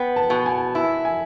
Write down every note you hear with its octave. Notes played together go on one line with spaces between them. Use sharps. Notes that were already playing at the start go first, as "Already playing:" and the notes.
Already playing: B3 G5
A5
B2
G#5
E4
G#5